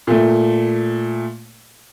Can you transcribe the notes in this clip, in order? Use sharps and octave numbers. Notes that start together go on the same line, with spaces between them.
A#2 A3